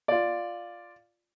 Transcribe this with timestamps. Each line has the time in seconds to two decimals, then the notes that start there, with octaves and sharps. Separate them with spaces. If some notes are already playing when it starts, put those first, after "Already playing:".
0.08 F4 D5